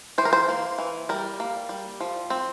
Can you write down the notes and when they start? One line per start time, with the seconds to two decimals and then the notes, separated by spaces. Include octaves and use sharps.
0.18 E3 C5
0.25 A#4
0.33 C5
0.48 A#3
0.78 E3
1.09 G3 A#4
1.40 A#3
1.69 G3
2.01 F3
2.30 C4